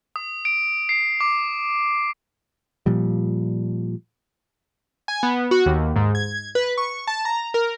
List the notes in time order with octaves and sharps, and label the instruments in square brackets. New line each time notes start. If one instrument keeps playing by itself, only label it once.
[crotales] D#6
D7
C7
D6
[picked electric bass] A#2 F3 G3
[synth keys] G#5
B3
F#4
D#2
G#2
G#6
B4
C#6
A5
A#5
A#4